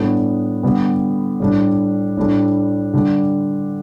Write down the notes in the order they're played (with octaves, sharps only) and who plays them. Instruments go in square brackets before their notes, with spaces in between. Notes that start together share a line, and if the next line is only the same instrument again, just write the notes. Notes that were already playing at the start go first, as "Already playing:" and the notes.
Already playing: [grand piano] A2 G3 B3 D4
D3 G3 B3
A2 G3 D4
A2 G3 D4
D3 G3 D4